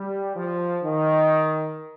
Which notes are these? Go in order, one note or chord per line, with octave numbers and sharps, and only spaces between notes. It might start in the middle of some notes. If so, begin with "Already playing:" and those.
Already playing: G3
F3
D#3